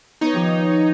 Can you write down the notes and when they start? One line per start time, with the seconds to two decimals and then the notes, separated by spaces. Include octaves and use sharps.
0.21 B3 D#4 B4 C#5
0.33 D#3 F3 G4